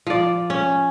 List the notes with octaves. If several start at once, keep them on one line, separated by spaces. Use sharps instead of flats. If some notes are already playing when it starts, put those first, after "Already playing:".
F3 D5
C#4